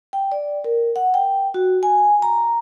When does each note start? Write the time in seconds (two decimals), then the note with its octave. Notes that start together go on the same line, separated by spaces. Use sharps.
0.13 G5
0.32 D5
0.64 A#4
0.96 F#5
1.14 G5
1.54 F#4
1.83 G#5
2.22 A#5